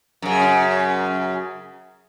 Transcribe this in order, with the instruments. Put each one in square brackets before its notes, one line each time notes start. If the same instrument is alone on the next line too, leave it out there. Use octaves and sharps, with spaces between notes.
[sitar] F#2 C#3